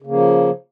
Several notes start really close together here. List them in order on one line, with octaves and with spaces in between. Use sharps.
C#3 A#3 F3